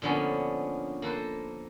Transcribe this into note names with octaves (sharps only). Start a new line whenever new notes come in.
A#2 D3 F3 B3 C#4
A#3 A4 B4 C5